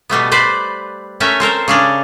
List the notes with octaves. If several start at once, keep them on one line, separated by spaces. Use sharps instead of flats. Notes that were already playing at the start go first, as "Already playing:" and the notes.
B2 G3 A3 B3
B4 C5 D5
A3 C#4 A#4 E5
C4 A4 A#4 C5
C#3 C#4 D4